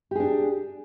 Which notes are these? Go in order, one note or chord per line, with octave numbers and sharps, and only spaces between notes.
D4 G4 G#4